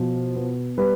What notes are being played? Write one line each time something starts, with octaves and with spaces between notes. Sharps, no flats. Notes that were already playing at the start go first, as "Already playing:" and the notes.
Already playing: B2 F3
B3
G3 B4